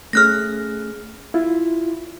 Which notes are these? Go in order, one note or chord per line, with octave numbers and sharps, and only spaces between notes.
A3 C#4 G#4 F6 F#6 A#6
E4 F4